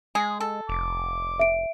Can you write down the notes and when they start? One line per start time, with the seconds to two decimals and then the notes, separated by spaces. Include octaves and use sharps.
0.15 G#3 G#4
0.40 A4
0.69 F1 D6
1.39 E5 D7